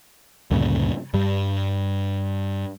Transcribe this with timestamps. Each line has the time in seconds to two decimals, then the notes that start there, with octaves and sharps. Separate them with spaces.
0.51 D2 G2 A#2 C#3
1.14 G2 G3